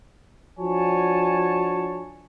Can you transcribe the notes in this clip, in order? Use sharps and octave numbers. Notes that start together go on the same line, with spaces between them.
F3 D4 F#4 C#5 G#5 A5